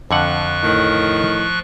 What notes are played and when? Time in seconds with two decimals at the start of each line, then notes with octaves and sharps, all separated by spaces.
0.11 F2 D3 F3 F#5 C#6 F#6
0.64 A2 D#3